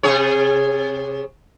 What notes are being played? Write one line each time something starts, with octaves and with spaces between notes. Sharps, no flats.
C3 G#4 C#5